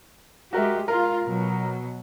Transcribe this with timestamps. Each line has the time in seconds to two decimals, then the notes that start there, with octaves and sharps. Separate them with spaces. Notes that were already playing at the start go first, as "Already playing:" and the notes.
0.53 G#3 F#4 G4 A#4 E5
0.88 F4 A#4
1.23 B2 F#3